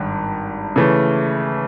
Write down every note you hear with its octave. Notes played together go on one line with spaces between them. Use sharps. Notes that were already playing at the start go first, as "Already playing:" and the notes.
Already playing: G#1 G2
C#3 E3 A3